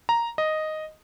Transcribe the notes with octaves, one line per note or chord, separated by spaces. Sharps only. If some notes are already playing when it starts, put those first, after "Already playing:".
A#5
D#5